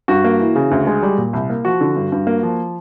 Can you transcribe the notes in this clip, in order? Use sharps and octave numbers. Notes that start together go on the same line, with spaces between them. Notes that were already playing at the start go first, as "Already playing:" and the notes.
G2 F#4
A#3
E3
C#3
D2
G#3
G3
A#2
C2
A#3
F3 F#4
D3
G2
G2
A#3
F3